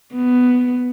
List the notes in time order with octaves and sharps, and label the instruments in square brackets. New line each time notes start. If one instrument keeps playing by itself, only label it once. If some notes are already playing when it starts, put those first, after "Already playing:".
[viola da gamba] B3